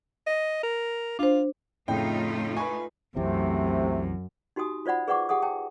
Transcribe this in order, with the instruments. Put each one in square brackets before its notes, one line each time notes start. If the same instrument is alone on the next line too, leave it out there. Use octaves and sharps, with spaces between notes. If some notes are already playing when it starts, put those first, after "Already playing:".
[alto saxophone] D#5
A#4
[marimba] D4 C5 [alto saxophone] F4
[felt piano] F2 A2 C#3 [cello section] A3 D#4 F4 [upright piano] G5
[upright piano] B4 G#5 [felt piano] C#6
[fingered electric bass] C2 E3 C4 [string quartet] F#2 [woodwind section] C3 [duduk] A3
[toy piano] D#4 F#4 G4 G#5 D#6
F4 C5 D5 F#5 B5
G#4 B4 D5 F#5 C#6 D6
G4 G#4 F#5 G#5 D#6
G5 A5